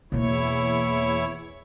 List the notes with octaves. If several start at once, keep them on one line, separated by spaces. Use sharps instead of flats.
E2 B2 A#3 E4 C#5